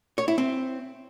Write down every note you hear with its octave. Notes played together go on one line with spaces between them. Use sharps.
C#5
E4
C4